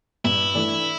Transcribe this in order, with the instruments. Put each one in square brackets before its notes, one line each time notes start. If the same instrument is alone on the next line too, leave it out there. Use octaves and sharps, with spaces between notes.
[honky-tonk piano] G2 [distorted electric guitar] E4
[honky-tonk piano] E3 A3 D4